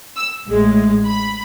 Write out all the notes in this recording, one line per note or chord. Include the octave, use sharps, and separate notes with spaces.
E6
A1 A2 G#3
B5